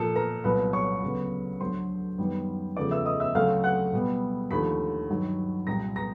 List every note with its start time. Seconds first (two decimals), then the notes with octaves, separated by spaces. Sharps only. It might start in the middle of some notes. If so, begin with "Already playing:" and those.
Already playing: A#2 F3 A#3 A4 A5
0.15 A#4 A#5
0.44 C2 A#2 F#3 B3 B4 B5
0.73 C#5 C#6
1.02 D2 C#3 F#3 B3
1.60 D2 D3 F#3 C5 C6
2.18 F#2 D#3 G3 B3
2.76 E2 C#3 F3 A3 D5 D6
2.91 E5 E6
3.06 D#5 D#6
3.20 E5 E6
3.34 D2 C#3 F#3 A3 C4 F5 F6
3.64 F#5 F#6
3.93 B2 G3 B3
4.51 D#2 D3 F3 A3 B5 B6
5.09 G2 D#3 F#3
5.67 C2 A#2 G3 C4 A#5 A#6
5.96 A#5 A#6